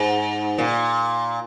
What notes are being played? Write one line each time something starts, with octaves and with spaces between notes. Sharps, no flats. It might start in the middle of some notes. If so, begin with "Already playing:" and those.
Already playing: G#2
A#2